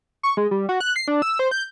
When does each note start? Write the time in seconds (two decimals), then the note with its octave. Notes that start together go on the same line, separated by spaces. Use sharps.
0.23 C#6
0.37 G#3
0.51 G3
0.69 F#4
0.80 F#6
0.96 C7
1.08 D4
1.22 E6
1.39 C5
1.51 G6